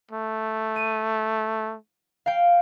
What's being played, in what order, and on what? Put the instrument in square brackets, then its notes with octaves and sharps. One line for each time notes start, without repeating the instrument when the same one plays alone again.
[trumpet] A3
[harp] D#7
F5 G5